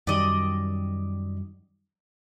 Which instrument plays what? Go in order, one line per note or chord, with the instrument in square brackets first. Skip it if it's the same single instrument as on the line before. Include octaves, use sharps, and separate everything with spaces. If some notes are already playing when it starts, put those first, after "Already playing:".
[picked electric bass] F#2 D#3 G3 [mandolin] D5 D#5